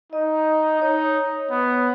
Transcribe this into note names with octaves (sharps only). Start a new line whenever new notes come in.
D#4 D#5
D#4 C#5
B3